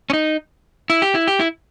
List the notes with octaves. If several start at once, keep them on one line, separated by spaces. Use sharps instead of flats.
C#4
D#4
E4
G4
E4
G4
E4